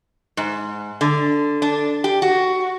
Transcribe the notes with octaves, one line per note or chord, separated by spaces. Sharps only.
G#2
D3
D4
G4
F#4